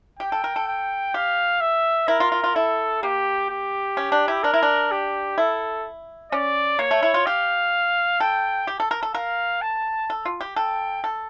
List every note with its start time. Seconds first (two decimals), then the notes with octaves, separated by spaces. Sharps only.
0.19 G4 G5
0.32 A4
0.44 A#4
0.56 A4
0.67 G5
1.14 G4 F5
1.61 E5
2.08 E4 A#4
2.20 F4
2.32 F4
2.44 F4
2.55 E4 A4
3.03 A#3 G4
3.50 G4
3.97 C#4
4.12 D4
4.28 E4
4.43 D4 A#4
4.54 E4
4.63 D4
4.91 G4
5.38 E4 A4
6.32 C#4 D5
6.79 A#3 C#5
6.91 A3
7.03 E4
7.14 F4
7.26 G4 F5
8.20 A4 G5
8.67 G4
8.80 A4
8.91 A#4
9.03 A4
9.14 A#4 F5
9.61 A5
10.10 A4
10.25 F4
10.41 G4
10.56 A4 G5
11.04 A4